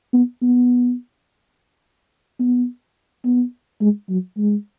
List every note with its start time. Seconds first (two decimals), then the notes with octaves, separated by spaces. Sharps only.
0.13 B3
0.42 B3
2.40 B3
3.25 B3
3.81 G#3
4.09 F#3
4.37 G#3